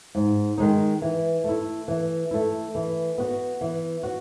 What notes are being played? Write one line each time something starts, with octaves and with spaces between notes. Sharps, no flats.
G#2
D#3 G#3 D#4
E3
A3 E4
E3
A3 E4
E3
B3 F#4
E3
F#4